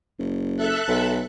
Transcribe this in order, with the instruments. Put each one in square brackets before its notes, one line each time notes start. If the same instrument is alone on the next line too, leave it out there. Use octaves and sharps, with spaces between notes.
[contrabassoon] F#1
[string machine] A4 E5 F#6
[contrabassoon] B1